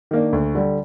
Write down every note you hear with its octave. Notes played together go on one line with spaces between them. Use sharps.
D#3 A#3 D4
D2
D3 G3